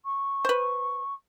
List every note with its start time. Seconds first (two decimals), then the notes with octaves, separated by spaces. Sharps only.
0.05 C#6
0.45 B4 C5